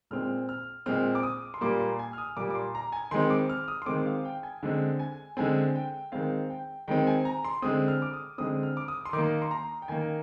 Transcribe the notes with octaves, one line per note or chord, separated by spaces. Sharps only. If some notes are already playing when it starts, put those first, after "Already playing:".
A#2 G#3 C4 F6
F6
A#2 G#3 C4 F6
D6
D#6
C6
A#2 G3 A#3 D6
C6
G#5
F6
D#6
A#2 G3 A#3 D6
D6
C6
A#5
G#5
D#3 G#3 C4 C6
D6
F6
D#6
C6
D#3 G#3 C4 D6
F5
G5
G#5
D3 G#3 C4
G#5
D3 G#3 C4 G#5
G5
D#3 G#3 C4 F5
G5
D#3 G#3 C4 G5
G#5
A#5
C6
D3 G#3 C4 D#6
F6
D6
D#6
D3 G#3 C4 D#6
F6
D6
D#6
C6
D#3 D6
A#3
C6
A#5
G5
D#3 A#3 G#5